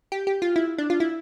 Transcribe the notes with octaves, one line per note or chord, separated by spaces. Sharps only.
G4
G4
F4
E4
D4
F4
E4